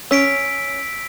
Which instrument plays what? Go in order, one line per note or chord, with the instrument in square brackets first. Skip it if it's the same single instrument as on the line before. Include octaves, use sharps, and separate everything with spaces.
[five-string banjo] C#4 [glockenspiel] E6 B6 D7